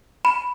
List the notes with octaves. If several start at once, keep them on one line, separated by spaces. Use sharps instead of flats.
B5